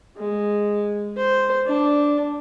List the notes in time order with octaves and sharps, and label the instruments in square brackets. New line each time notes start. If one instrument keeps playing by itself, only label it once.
[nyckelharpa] G#3
C5
D4